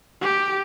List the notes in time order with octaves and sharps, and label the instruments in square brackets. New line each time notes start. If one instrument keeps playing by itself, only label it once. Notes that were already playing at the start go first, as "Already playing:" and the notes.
[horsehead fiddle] G4